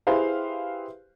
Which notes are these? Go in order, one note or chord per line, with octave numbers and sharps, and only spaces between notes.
E4 G4 G#4 B4 C5 F5